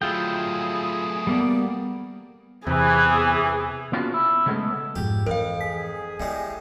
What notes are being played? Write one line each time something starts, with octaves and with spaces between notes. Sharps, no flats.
F#3 A3 E4 F4 G#4 G5
G3 A#3 B3 D5
E2 C3 E3 G#4
A#3 B3 C#4 D4 F4 F#4
E4
C#3 G#3 A3 B3 C#4
F2 G#2 G4
F2 E3 A#4 F5
G#4 B6
A2 G3 G#3 C4